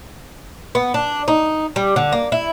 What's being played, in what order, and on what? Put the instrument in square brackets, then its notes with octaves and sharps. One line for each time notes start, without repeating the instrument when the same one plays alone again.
[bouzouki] B3
D4
D#4
G3
D3
A#3
E4